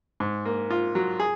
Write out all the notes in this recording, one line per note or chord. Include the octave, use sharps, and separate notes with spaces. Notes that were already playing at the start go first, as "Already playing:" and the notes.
G#2
A#3
F4
F#3
G#4